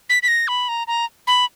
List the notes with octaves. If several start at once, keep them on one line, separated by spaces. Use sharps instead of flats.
B6
B6
A#6
B5
A#5
A#5
B5